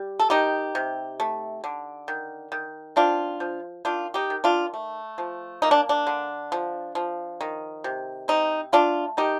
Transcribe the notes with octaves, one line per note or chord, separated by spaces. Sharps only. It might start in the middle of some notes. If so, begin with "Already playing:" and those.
Already playing: G3
A4
D#3 D#4 G4
C3
A3
D3
D#3
D#3
C4 D4 F4
F3
D#3 D4 F4
D#4 G4
D#3
D4 F4
A3
F3
A#3 D#4
D4
D4
D3
F3
F3
D#3
C3
C4 D#4
A3 D4 F4
D#3 D#4 G4